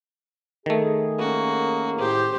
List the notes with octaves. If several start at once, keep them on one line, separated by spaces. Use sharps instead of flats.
D#3 A3 G#4
A#3 C#4 F#4
A2 G4 G#4 C5